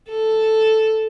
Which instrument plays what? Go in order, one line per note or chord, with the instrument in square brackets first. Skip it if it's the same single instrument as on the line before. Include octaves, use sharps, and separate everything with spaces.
[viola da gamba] A4